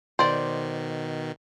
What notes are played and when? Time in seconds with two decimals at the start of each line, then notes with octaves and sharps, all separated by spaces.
0.19 B2 D#3 C5 D5